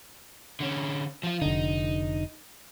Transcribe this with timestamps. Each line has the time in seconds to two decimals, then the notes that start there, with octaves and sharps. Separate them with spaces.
0.60 D3 C#4
1.23 F3 F4
1.42 F1 D3 D#4